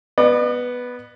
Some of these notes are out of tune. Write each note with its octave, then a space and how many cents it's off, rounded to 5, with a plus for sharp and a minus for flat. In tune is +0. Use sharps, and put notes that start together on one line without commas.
B3 +0 D5 +45